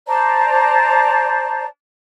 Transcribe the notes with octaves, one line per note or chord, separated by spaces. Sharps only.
C5 D5 A5 A#5